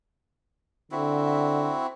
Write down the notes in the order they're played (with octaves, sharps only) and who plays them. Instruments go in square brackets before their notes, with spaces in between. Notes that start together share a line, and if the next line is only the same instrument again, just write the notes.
[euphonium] D3 [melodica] C4 E4 F#4